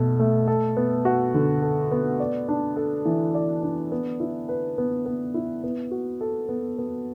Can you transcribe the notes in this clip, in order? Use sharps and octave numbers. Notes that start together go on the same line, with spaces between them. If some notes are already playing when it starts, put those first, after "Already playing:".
Already playing: B2 A3 A4
A3
A4
B3
F#4
D3
A4
B3
D5
D4
A4
E3
D5
D4
B3
E4
B4
B3
B3
E4
B3
F#4
A4
B3
B3